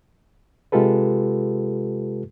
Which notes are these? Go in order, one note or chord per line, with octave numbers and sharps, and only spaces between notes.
C3 G#3 F4 G4 A4 B4